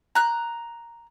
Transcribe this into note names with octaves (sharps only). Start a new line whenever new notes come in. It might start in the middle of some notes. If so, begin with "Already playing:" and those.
A#5 F#6